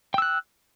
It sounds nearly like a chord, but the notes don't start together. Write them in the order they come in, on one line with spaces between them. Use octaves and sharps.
G5 E6 F#6